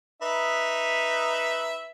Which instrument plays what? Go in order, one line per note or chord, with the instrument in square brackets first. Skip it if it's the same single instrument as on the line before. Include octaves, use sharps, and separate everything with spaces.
[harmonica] D#4 B4 E5